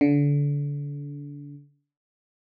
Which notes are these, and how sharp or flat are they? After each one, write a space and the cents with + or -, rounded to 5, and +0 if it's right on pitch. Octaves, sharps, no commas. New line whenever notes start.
D3 -30